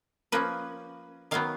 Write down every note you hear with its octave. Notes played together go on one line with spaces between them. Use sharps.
F3 A#3 C#4 B4
D#3 F#3 B3 F5